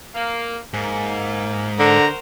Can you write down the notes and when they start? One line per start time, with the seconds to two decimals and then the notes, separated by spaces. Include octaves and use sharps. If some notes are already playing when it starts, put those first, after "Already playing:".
0.15 A#3
0.74 G#2 A#3
1.79 D3 F#4 A#4 C5 A#5